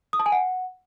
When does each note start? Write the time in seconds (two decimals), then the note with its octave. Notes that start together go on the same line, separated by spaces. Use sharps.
0.13 D#6
0.19 A5
0.26 G#5
0.32 F#5